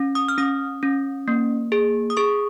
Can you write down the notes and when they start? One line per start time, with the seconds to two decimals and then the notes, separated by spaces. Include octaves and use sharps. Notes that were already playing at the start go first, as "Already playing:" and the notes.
Already playing: C#4
0.15 D#6
0.28 F6
0.38 C#4 D#6
0.83 C#4
1.28 A#3
1.72 G#4
2.10 D#6
2.17 G#4 C#6